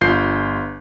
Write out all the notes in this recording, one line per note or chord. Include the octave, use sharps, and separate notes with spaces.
G1 F4 G6 C7